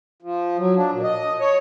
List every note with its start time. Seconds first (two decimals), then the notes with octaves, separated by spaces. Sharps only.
0.22 F3
0.58 F#3
0.76 D4
0.92 A#2
1.03 D#5
1.40 C#5